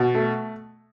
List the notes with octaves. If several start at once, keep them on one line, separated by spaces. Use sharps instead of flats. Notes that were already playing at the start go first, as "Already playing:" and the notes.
Already playing: B2
A3